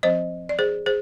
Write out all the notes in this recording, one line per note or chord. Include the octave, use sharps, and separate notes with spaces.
F3 C4 C5 D#5
D5
G#4 C5
G#4 C5